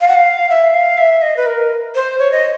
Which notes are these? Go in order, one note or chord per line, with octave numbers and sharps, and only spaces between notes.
F5
F#5
F5
E5
F5
E5
D#5
B4
A#4
C5
C#5
D#5